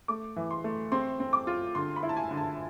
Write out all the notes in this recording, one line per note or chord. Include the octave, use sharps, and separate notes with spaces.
A3 D6
E3
C6
A3
C4 C6
C4
D6
F4
D3 C6
B5
E4
A5
G#5
D3
A5